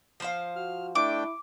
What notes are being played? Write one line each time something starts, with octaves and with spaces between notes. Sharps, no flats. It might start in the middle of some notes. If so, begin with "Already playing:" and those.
F3 C5 F5
F#4 F6
A3 D4 E4 G5 D6